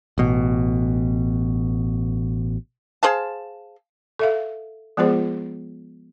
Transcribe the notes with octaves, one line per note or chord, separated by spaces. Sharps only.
A1 B2
G#4 C5 F5 A5
A4 E5 F5
F3 G#3 B3 F4 G#4 C5